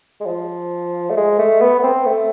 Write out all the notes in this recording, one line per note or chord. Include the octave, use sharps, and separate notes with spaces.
G#3
F3
A3
G#3
A3
B3
B3
C4
A3